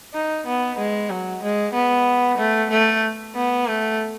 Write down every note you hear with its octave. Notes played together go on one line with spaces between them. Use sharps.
D#4
B3
G#3
F#3
G#3
B3
A3
A3
B3
A3